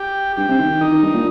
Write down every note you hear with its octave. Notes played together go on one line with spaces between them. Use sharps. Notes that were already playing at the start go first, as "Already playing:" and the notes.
Already playing: G4
G2 G4
C3
D#3
D#3
D#3 D#4
D#3
G2
A#2